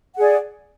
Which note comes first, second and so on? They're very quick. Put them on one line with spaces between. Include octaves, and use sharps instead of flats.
F#5 G#4 D5